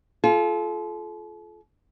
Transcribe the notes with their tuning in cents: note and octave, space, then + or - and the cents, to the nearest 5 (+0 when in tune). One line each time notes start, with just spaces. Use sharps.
F4 -15 A4 -40